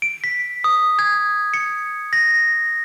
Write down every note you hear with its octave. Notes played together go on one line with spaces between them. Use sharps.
D7
B6
D#6
G#6
C#7
A#6